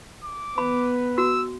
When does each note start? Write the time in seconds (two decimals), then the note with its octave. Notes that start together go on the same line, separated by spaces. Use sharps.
0.25 D6
0.58 B3 B4 B5
1.18 F#4 E6